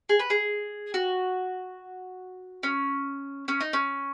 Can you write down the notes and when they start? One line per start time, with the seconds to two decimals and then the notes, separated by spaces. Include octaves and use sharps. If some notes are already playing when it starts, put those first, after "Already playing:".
0.09 G#4
0.19 B4
0.30 G#4
0.94 F#4
2.63 C#4
3.48 C#4
3.61 D#4
3.73 C#4